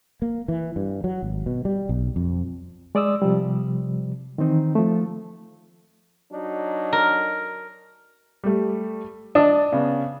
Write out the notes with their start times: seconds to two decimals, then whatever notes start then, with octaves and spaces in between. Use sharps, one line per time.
0.22 A#3
0.48 E3
0.76 G2
1.04 F#3
1.22 G#1
1.46 B2
1.65 G3
1.89 B1
2.16 F2
2.95 G#3 D5 D#6 E6
3.22 C3 F3 G3
4.38 D#3 E3 C4 D#4
4.75 F3 A3
6.32 F#3 D4 D#4
6.93 A#4
8.44 G3 A3
9.35 D4 D#5 A5 D#6
9.72 C#3 B3